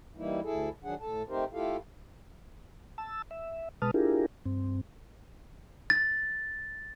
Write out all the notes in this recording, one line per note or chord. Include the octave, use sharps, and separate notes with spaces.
E3 G3 A#3 D#4 E4
D2 E4 G#4 A4
D#3 F#3 D4 G#4 F#5
A2 A4 A5
A3 C4 D#4 G4 A#4 C5
A3 E4 F4 G4 A4 F5
A5 E6
E5
B2 G#3 B4 A5 D#6 F6
D4 E4 F4 G4 G#4 A#4
G2 C4
A6